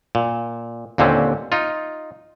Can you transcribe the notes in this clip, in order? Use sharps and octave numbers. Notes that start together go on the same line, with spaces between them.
A#2
D#2 A#2 D3 C4 C#4
D#4 F4